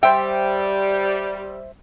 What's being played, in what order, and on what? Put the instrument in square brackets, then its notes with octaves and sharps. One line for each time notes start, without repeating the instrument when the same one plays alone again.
[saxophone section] G3 [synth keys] C5 E5 [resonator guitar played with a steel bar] G5